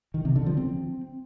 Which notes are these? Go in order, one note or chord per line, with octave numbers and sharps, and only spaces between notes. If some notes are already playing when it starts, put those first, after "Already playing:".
D#3
C3
D3
F3
C4